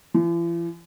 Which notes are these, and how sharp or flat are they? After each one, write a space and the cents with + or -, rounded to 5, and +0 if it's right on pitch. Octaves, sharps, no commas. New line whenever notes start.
E3 +45